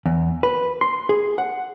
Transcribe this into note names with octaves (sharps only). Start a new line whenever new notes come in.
E2
B4
C6
G#4
F#5